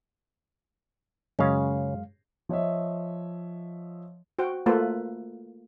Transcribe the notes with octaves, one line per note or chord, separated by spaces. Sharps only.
F#2 C#3 G#3 C#4 F5
F3 C#5 D#5 E5
F#4 C5 G5
A3 A#3 F4 A4 B4 C5